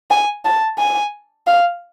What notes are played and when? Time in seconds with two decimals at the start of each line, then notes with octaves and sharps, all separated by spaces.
0.10 G#5
0.45 A5
0.79 G#5
1.47 F5